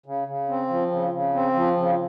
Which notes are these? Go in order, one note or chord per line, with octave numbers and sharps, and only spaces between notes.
C#3
C#3
C4
F3
C#3
C#3
C4
F3
C#3